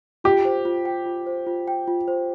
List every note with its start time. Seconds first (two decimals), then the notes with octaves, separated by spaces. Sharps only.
0.24 F4 G4
0.45 C5
0.65 F4
0.85 G5
1.06 F4
1.26 C5
1.47 F4
1.68 G5
1.88 F4
2.08 C5